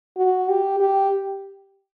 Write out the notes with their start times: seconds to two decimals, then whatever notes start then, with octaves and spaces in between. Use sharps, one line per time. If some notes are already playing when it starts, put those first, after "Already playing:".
0.17 F#4
0.49 G4
0.80 G4